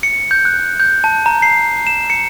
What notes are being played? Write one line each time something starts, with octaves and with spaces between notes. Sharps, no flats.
C#7
G6
F#6
G6
A5
A#5
C7
E7
C#7